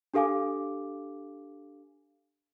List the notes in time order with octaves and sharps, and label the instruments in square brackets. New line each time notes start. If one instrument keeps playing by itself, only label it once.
[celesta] D4 G4 A4 F5 G#5 D6